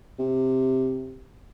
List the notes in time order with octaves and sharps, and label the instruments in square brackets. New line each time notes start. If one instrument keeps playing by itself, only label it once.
[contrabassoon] C3